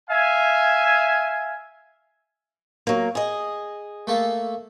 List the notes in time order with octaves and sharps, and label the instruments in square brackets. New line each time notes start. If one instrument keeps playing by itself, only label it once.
[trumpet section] E5 F5 G#5
[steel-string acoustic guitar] F#3 A#3
G#4 D#5
[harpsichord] A3 A#3 A4